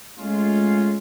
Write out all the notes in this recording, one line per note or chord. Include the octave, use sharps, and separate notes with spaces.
G#3 A3 C#4 F4